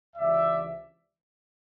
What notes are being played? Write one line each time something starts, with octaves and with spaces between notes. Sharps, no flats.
C#2 C3 E3 D5 E5